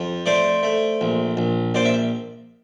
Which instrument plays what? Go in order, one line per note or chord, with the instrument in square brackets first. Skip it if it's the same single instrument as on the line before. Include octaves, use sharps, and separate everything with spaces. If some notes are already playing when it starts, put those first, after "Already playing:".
Already playing: [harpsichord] F2
A3 C5 D5
A3
A#1
A#1
A#1 C5 D5
E5